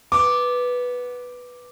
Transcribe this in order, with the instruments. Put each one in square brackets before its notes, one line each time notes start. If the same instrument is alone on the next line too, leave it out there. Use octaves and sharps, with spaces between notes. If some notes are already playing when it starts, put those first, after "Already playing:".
[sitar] B3 [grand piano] D6